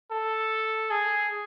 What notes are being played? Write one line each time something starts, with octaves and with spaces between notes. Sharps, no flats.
A4
G#4